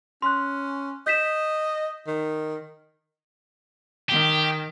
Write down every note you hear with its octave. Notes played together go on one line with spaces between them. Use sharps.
C#4 C6 F#6
D#5 G6 B6 E7
D#3
D#3 G4